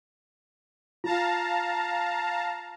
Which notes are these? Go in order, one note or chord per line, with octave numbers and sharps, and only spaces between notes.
F4 F5 A5 A#5